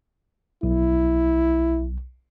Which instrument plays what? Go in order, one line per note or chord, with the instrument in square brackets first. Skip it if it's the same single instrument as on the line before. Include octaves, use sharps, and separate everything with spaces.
[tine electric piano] B1 [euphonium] E4